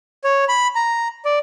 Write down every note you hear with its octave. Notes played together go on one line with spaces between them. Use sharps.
C#5
B5
A#5
D5